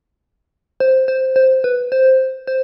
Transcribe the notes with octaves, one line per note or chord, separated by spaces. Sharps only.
C5
C5
C5
B4
C5
C5